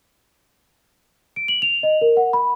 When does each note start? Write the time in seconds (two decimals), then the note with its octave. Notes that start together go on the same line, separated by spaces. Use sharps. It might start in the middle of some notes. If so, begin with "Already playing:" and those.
1.36 D7
1.48 F#7
1.62 F7
1.83 D#5
2.01 A#4
2.17 F#5
2.33 B5